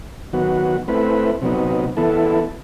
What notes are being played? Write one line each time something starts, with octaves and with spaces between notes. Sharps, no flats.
D#3 F#3 B3 F#4
A3 C4 E4 B4
C3 F#3 B3 D#4
E3 B3 E4 A4